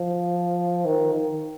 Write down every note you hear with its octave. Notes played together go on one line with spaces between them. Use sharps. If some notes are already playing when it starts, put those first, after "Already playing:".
Already playing: F3
D#3
D#3